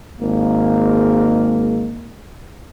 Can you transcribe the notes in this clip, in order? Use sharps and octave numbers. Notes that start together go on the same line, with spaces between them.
G#1 G#3 A#3